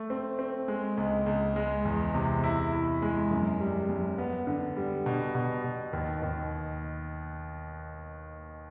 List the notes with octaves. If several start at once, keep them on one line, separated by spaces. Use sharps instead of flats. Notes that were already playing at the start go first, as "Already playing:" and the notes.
Already playing: A3
C4
C4
G#3
C#2
C#2
G#3
E2
C3
E4
E4
G#3
F#2
G3
F#2
B3
D3
G3
B2
B2
B2
D#2
D#2